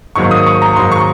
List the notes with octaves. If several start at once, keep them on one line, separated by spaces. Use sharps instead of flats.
G#2 D#3 F#3 A#3 C#6
D#6
C#6
A#5
G#2 D#3 F#3 A#3 C6
C#6